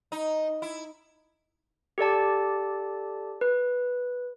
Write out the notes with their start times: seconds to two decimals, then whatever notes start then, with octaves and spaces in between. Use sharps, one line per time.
0.12 D#4
0.62 E4
1.98 G4 A4 D5 A5
3.41 B4